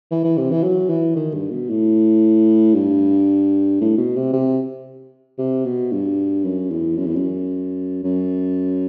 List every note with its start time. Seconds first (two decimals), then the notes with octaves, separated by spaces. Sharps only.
0.11 E3
0.24 E3
0.37 C3
0.51 E3
0.63 F#3
0.89 E3
1.16 D#3
1.34 G2
1.51 B2
1.70 A2
2.74 G2
3.81 A2
3.98 B2
4.16 C3
4.33 C3
5.38 C3
5.65 B2
5.92 G2
6.44 F#2
6.70 E2
6.97 F#2
7.06 E2
7.16 F#2
8.04 F#2